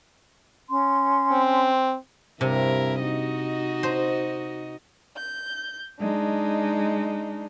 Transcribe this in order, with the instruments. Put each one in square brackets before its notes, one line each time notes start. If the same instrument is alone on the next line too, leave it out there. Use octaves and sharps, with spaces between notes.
[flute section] C#4 C6
[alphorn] C4
[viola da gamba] G2 E4 A#4 [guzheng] C3
[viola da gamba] D#4 F#4 D#5
[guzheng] C5
[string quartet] G6
G#3 D4 D#4